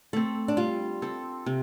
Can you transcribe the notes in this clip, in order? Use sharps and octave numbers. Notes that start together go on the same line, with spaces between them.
A3 C4 A4
D4
G3 F4
C4 A4
C3